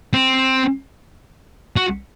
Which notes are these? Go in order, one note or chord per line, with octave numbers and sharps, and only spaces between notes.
C4
F#4